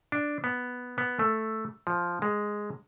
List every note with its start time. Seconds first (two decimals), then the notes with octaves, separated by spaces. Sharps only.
0.12 D4
0.44 B3
0.98 B3
1.19 A3
1.87 F3
2.22 G#3